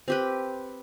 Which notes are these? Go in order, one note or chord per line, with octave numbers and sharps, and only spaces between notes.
C4 G4 B4